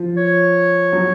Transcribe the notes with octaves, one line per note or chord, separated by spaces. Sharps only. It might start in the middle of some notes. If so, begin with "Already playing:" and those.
Already playing: F3
C#5
F#3